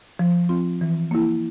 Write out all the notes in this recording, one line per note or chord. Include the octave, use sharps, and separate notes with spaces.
F3
C4 F4
E3
A#3 E4